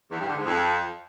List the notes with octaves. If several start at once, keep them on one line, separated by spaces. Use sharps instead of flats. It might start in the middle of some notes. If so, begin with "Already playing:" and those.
E2
G2
D3
G#2
F2